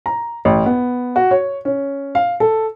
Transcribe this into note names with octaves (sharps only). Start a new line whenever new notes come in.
A#5
A1
B3
F#4
C#5
C#4
F5
A4